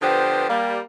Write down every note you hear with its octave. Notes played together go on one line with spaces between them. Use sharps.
D3 F3 B3 G4 B4 C5
G3 A#3